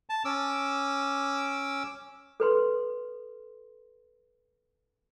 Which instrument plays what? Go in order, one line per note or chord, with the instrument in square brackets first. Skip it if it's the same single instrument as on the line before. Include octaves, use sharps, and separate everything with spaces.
[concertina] A5
C#4 D6 E6
[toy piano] A4 B4 C6